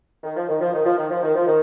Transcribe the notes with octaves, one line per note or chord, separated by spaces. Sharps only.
D#3
F3
D#3
F3
D#3
F3
D#3
F3
D#3
F3
D#3